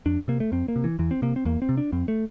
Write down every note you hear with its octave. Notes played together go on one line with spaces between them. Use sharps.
F2 D4
C3 A#3
A3
F2 C4
A#3
C3
E3
E2 E3
C4
C3 A#3
C4
E2 A#3
C4
C3
D4
F2 C4
A3